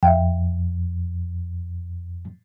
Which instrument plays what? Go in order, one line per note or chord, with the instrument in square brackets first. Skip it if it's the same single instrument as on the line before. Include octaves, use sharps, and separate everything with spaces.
[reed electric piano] F2 [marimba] E5 F5 G5